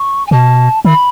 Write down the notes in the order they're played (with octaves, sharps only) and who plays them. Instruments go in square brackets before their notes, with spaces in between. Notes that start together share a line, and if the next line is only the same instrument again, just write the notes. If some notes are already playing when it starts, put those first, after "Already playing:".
Already playing: [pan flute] C#6
G#5
[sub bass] B2 [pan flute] A5
[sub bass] D#3 [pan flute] B5